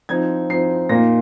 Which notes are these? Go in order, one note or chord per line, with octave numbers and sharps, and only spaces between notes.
F3 C4 D#4 G#6
F3 C4 D#4 C7
A#2 A#3 D#4 A#6